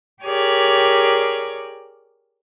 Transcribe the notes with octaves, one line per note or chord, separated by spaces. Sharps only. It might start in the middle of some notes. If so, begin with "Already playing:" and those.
G4 G#4 A#4 C#5 D5